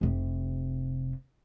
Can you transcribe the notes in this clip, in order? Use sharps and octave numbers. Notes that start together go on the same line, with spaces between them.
F1 C3